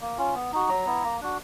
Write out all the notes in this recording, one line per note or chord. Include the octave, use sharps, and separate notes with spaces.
A#3
C#4 F4
B3
D#4 F#4
F#3 A#5
B3 E4
A#3
D4 F#4